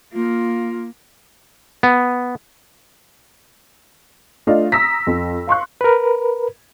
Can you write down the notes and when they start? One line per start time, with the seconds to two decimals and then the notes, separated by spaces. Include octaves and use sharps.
0.13 A#3 F4
1.83 B3
4.47 A3 D4 F4 D#5 F5
4.72 A#5 D#6 E6 A#6 B6
5.07 F2
5.47 F5 C6 C#6 F#6
5.81 A#4 B4